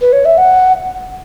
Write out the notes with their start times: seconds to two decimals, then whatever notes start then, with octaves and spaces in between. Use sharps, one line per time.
0.01 B4
0.12 C#5
0.25 E5
0.38 F#5